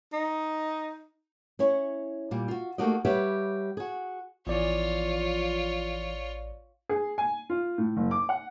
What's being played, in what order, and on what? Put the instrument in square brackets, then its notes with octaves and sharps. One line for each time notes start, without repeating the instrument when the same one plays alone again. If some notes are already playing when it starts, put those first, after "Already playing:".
[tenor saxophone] D#4
[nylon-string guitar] C#4 E4 C#5
A#2 G3
F4 F#4
A3 A#3 D#4 F#4 G4 D#5
G3 G4 B4 C#5 E5 F#5
F#4 G#4
[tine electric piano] A1 D5 [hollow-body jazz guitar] E2 E3 [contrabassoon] F3 [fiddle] F4 C#5
[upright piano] G#4
G#5
F4
A2
F#1
D6
F#5